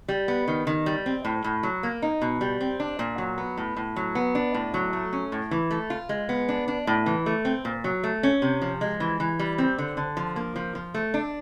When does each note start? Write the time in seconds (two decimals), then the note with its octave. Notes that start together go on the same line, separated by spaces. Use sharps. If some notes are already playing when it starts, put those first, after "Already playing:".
0.08 G3
0.28 B3
0.48 D#3
0.67 D#3
0.86 G3
1.06 C4
1.25 A2
1.44 A2
1.63 F#3
1.83 A#3
2.02 D#4
2.22 B2
2.41 G3
2.61 C4
2.80 D4
2.99 A#2
3.18 F#3
3.38 B3
3.57 A2
3.76 A2
3.96 F#3
4.15 B3
4.35 D4
4.54 A2
4.74 F#3
4.93 A3
5.13 C#4
5.32 A2
5.51 E3
5.71 A3
5.90 F4
6.09 G#3
6.29 B3
6.49 D4
6.68 D4
6.87 A2
7.06 E3
7.26 A3
7.45 C4
7.65 A#2
7.84 F#3
8.04 A3
8.23 C#4
8.42 C3
8.62 F3
8.81 G#3
9.00 E3
9.20 E3
9.39 G3
9.58 C4
9.78 D3
9.97 D3
10.17 F3
10.36 A#3
10.56 F3
10.75 F3
10.94 A3
11.14 D4